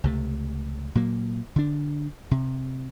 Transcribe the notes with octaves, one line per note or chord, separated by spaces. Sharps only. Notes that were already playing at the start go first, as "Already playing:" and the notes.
C#2 C3 A3
A#2 F#3 A#3
D3 D4
C3